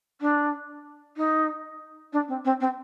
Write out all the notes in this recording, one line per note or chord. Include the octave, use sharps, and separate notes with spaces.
D4
D#4
D4
C4
C4
C4